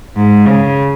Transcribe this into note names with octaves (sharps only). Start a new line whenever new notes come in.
G#2
C#3